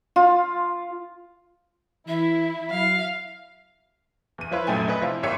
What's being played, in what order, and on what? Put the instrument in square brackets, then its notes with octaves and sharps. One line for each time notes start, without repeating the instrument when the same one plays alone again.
[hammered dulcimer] F4
[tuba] E3 [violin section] E4 [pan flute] E5
[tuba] F#3 [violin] F5
[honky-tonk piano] E2 D#7
F3 E4 F4 B4 C#5
F1 A#1 F#2 A3 G5 G#5
B4 D#5
C3 F3 E4 F4
G#1 D2 G4 C#5 E5 C#7